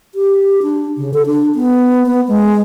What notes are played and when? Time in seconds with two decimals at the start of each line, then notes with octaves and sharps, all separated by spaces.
0.15 G4
0.63 D4
0.98 C#3
1.14 A4
1.26 D4
1.55 B3
2.06 B3
2.28 G#3